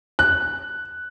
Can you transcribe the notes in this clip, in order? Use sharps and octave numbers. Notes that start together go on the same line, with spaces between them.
F#6